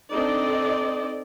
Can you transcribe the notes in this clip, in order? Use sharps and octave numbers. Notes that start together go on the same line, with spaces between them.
C4 D4 D#4 A4 D5 D#5